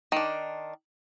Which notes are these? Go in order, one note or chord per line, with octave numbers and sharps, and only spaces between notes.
D#3 D4